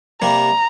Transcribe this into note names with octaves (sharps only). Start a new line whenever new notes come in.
C3 G3 A#3 A#5